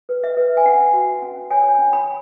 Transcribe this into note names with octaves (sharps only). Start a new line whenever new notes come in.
B4
E5
B4
G#5
C#4 F#5
F#4
C#4
C#5 G#5
C#4
B5